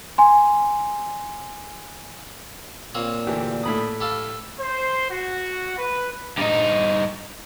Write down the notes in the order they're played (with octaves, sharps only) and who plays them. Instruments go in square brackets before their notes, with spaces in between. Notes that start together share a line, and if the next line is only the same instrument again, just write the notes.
[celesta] G#5 C6
[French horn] A#2 [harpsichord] A#3 C4 C#5
[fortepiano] D2 E3 G4
A2 B5 D#6
[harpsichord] G4 A4 F5
[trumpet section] C5
F#4
B4
[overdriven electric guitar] G2 D#4